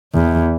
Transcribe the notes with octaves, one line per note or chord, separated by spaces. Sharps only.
E2